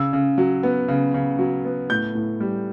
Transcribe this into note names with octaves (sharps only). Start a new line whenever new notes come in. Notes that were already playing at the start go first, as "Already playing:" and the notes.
Already playing: C#3 E6
C#3
F#3
B3
C#3
C#3
F#3
B3
A2 G6
A2
G3